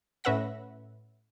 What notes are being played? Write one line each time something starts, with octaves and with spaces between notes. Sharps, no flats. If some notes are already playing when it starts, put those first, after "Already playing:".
A2 C#4 B4 E5 F#5 A#6